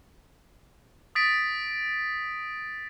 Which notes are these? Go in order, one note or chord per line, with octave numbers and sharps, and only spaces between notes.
D#6 A6 B6 D7